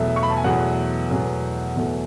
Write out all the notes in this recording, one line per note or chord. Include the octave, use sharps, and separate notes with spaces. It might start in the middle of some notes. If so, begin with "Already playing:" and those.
Already playing: E2 B2 F#3 A3 E5
C#6
B5
A5
G#5
E2 B2 F#3 A3 F#5
E2 B2 F#3 A3
E2 B2 F#3 A3